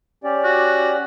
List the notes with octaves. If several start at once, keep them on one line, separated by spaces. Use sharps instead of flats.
C#4 G4 D5
F#4